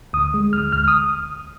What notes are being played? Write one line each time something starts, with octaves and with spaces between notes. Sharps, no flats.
D2 D#6
G#3
D2 F6
D2 F6
D#6